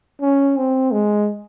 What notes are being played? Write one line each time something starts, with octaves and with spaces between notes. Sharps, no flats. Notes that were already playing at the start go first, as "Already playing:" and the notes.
C#4
C4
G#3